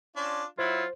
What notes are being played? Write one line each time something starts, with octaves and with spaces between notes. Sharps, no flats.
C#4 D4 F4
F#3 E4 F4 C5